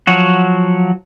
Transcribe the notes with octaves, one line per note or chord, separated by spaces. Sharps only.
F3 F#3 F#4